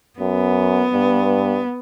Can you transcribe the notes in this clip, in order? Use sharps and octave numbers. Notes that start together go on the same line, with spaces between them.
F#2 B3
G2